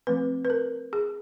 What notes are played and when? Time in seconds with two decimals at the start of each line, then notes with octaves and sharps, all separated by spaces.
0.07 F3 A3 C4 B4
0.45 B4
0.50 A#4
0.93 G#4